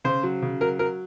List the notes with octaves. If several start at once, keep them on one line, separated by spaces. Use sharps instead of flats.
C#3 C5
F#3
C#3
F#3 A#4
F#3 A#4